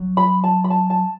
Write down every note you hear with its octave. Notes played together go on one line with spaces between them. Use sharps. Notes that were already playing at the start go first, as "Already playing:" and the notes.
Already playing: F#3
B5
A5
B5
A5
A5